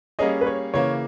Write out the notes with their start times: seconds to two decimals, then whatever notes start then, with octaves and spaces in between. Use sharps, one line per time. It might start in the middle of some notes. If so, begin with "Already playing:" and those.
0.19 G3 A#3 C#4 G#4 C#5 D#5
0.41 B4
0.47 C#5
0.74 C#3 E3 A#3 C#5